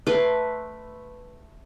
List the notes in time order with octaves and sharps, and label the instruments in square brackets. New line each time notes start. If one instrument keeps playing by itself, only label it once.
[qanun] A3 B4 C6 D6